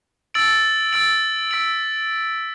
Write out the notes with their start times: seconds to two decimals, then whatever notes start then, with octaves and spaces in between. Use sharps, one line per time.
0.34 E6 A6 D7 F#7
0.93 E6 A6 D7 F#7
1.51 E6 B6 D7 F#7